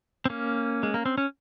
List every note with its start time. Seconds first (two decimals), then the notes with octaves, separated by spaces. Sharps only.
0.25 C4
0.30 A#3 C#4
0.83 G#3
0.94 A#3
1.06 C4
1.18 C#4